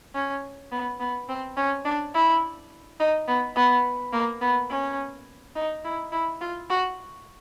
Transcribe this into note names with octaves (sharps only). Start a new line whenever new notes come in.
C#4
B3
B3
C4
C#4
D4
E4
D#4
B3
B3
A#3
B3
C#4
D#4
E4
E4
F4
F#4